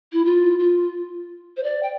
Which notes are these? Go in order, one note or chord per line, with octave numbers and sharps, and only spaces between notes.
E4
F4
F4
C5
D5
G5